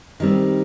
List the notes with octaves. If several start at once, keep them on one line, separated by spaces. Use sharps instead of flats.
D#3 G3 C4